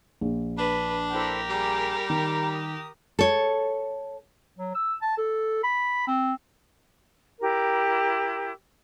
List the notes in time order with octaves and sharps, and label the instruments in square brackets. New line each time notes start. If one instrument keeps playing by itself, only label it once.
[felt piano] A#1
[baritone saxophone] D4 [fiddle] B4
[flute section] E4 A4 C5 [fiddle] G4 A#4
[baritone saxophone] G3 [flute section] G#4 A#5
[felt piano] D#3 [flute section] A#5
[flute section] D#6
[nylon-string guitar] A4 C#5
[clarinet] F#3
E6
A5
A4
B5
C4
[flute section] E4 G4 A#4